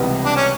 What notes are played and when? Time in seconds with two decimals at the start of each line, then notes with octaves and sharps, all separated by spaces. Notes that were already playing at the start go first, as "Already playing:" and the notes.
Already playing: C#2 C3 E3 G3 B3
0.25 D4
0.36 C#4